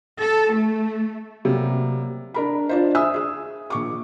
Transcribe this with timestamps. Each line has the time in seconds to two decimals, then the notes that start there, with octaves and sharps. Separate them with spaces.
0.19 A4
0.53 A3
1.45 C3 F#3 G3 A#3
2.34 D4 A#4 B5
2.69 D4 F4 C5
2.95 E5 G#5 D#6 E6
3.14 G#4 D#6
3.70 A#1 C#6 D6